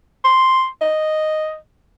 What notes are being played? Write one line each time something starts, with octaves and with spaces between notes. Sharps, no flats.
C6
D#5